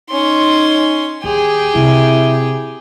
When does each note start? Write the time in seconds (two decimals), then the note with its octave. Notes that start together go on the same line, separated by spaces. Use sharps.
0.10 C#4 D#4 C6
1.24 D#2 G4 G#4
1.75 C3 E4